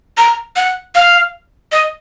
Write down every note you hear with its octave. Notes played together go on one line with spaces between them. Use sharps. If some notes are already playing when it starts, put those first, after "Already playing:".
A#5
F#5
F5
D#5